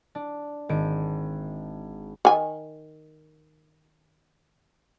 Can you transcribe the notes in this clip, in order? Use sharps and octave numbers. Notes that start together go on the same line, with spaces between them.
D4
G#1 D7
D#3 G#5